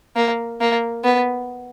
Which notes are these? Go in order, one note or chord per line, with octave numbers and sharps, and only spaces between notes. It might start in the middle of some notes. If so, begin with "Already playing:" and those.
A#3
A#3
B3